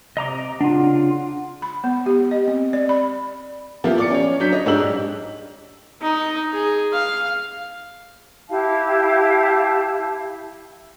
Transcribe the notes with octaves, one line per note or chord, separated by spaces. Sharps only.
C3 D#5 A#5 D6
C#3 D4 F4 F#5
B5
B3
G4
D#5
C4
D5
B5
F3 A#3 B3 E4 G4
D5 D6 C#7
C#4 C#5
F#3 D4 G6 B6
C#5 D#5
G#2 D4 D#4 G4 E6 F#7
D#4
G#4
F5
E4 G4 F5 A5